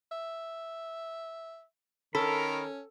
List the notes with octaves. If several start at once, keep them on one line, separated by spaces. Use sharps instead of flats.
E5
D#3 C#4 A4 A#4 B5